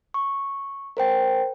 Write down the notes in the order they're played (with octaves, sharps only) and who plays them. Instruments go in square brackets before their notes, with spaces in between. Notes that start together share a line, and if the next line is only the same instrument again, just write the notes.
[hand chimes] C#6
A#4 C5 G5